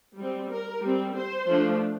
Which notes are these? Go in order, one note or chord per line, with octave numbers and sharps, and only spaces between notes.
G3 C4
A#4
G3 C4
C5
F3 A3 D4